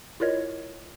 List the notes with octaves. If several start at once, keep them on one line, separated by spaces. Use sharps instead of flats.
E4 F4 A#4 C#5 D#5